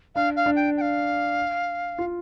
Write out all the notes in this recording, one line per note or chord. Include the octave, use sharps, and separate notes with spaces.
D4 F5
F5
D4
G5
G5
F5
F4